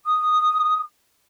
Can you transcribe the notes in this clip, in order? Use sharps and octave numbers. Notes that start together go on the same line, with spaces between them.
D#6